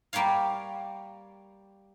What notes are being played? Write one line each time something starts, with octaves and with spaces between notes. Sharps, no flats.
G3 A#3 G4 C#5 F5